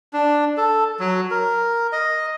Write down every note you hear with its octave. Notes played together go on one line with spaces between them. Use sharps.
D4
A4
F#3
A#4
D#5